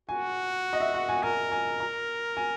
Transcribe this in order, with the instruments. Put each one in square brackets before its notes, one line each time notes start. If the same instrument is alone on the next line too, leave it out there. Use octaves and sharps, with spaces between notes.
[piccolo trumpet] F#4 [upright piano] G#5
[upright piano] D#5
E5
F#5
G#5
[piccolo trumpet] A#4 [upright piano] G#5
[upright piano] G#5
A#5
G#5